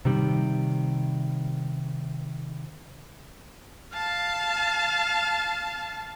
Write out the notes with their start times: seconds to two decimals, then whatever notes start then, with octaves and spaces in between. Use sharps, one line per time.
0.05 C3 D#3 G3
3.93 F5 A5